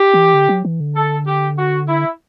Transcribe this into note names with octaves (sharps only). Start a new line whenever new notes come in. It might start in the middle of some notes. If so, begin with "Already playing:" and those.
Already playing: G4
E3
D3
F#3
E3
D3
A4
G4
F#4
E4